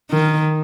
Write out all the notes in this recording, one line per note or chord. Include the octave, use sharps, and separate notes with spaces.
D#3